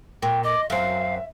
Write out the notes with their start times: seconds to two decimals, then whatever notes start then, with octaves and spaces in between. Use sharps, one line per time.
0.22 A#2 G5
0.44 D#5 D6
0.70 F#2 C4 E5 F5